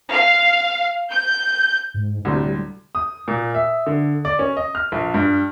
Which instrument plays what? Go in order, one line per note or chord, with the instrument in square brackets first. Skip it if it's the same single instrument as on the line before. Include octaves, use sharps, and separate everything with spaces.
[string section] F5
G6
[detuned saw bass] G#2
[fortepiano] D2 A2 C3 [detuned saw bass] G3
[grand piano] D#6
A#2
E5
D3
D5
C#4
D#5
F6
A#1
G2